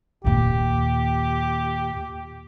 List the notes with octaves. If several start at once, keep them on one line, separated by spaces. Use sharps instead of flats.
D#2 A#2 G4